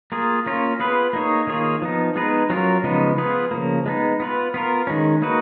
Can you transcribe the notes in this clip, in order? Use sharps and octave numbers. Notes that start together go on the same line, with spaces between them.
A#3 F4 G#4
A#3 C#4 F4
B3 F4 G#4 B4
A#3 D#4 G#4 C#5
D#3 A#3 F4 G#4 C#5
F3 B3 D#4
G#3 B3 D#4 G#4 B4
F#3 C#4 F4 A#4
C#3 F3 G#3 B3 D#4
B3 F4 G#4 B4
C#3 F3 A#3
G#3 B3 D#4
B3 F4 B4
B3 F4 A#4
D#3 G#3 C#4
A#3 D#4 F#4 B4